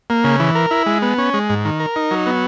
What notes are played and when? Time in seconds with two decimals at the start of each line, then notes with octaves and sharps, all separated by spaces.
0.10 A#3
0.24 C#3
0.40 E3
0.55 A#4
0.71 E4
0.86 G#3
1.02 B3
1.18 C#4
1.34 G#3
1.50 G#2
1.65 D#3
1.80 A#4
1.96 D#4
2.11 F#3
2.26 B3